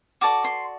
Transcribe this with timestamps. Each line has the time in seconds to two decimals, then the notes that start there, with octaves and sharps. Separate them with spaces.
0.21 F#4 A4 D5 D6
0.44 C6